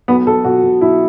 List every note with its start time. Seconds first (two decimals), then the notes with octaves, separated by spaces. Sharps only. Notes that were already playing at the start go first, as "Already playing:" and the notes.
0.08 B1 B3
0.26 B1 A4
0.44 B2 F#4
0.63 B2
0.81 B1 E4